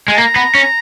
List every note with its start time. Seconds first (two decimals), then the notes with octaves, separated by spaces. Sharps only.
0.08 G#3 G#5
0.18 A#3 A#5
0.36 B3
0.55 C#4